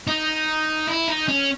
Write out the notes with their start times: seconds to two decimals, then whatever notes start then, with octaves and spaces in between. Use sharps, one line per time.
0.07 D#4
0.88 E4
1.08 D#4
1.28 C#4